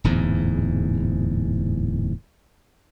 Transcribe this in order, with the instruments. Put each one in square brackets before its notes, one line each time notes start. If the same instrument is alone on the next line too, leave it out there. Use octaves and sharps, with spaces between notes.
[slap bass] D1 E2 G#2